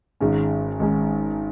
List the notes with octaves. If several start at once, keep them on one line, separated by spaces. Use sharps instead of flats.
G#1 G#2 G#3 C#4
G#1 G#2 G#3 C#4